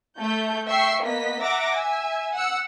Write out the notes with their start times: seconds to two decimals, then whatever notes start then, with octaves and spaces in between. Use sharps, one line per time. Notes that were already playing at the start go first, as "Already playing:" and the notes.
0.19 A3 G6
0.67 E5 G5 C#6 C7
1.03 A#3 B3 D#5 B6
1.42 E5 F#5 A#5 D6 A#6
1.73 E5 G#5
2.34 F#5 E6 C#7